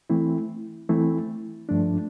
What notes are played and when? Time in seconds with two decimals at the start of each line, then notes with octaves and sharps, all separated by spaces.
0.10 E3 A3 C4 E4
0.89 E3 A3 C4 E4
1.69 G2 F3 A3 D4